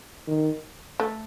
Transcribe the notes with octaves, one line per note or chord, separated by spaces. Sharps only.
D#3
A3